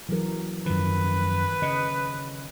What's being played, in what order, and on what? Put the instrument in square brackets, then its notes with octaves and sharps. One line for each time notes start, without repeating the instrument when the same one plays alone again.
[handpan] E3 F#3 A#4
[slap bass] F#2 F3 [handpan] D#3 [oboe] B4
[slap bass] C#3 [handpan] D#5